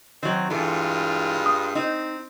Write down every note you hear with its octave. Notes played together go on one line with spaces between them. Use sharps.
D#3 F#3 C4
G2 E3 G#3 F4 A4
D#6
C4 D#4